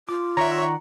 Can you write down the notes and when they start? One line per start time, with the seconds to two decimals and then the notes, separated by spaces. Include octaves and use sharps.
0.09 F4 D6
0.37 D#3 C#5 D5 E5 F#5 A#5 C#6